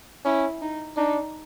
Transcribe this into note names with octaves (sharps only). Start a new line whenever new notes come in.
C#4 E4
D#4
D4 D#4